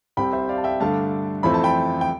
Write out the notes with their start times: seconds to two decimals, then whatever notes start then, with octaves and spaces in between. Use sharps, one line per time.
0.17 C2 C3 G3 C4 G5 B5
0.33 C5 E5
0.49 D5 F5
0.58 A5
0.64 E5 G5
0.80 G2 D3 A3 D4 F5 A5
1.43 F2 E3 A3 C4 B5
1.54 A5
1.64 G5 B5
2.01 G5